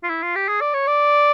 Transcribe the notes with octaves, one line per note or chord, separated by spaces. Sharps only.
F4
E4
F4
G4
G#4
D5
C#5
D5